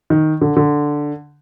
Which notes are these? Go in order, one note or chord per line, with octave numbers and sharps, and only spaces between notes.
D#3
D3
D3